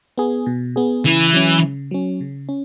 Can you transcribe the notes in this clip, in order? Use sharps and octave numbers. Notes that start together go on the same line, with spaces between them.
B3 G#4
B2
B3 G#4
C#3 E3
F#3 C#4
C#3
F#3 C#4
C#3
C#4